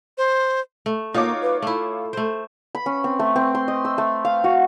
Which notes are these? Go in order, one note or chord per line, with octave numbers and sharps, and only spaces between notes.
C5
A3
A#3 D#4 F4 F#4 C#5 D6
B4
A3 E4 A4
A3 C5
B5
C#4
C4
A3
C4
C6
D#5
E6
A3
F5
F#4